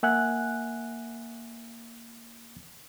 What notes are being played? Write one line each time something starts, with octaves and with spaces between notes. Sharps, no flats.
A#3 E5 F#5 G#5 F#6